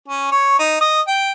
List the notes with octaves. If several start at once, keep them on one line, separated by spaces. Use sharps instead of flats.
C#4
C#5
D#4
D#5
G5